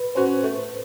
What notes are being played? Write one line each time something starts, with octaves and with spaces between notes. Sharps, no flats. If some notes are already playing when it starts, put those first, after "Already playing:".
Already playing: B4
C#4 F#4 C5
A3